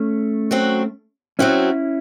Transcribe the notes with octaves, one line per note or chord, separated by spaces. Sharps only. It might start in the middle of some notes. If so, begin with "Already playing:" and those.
Already playing: A3 C#4
F#3 C4 F#4
F#3 C4 C#4 E4 F#4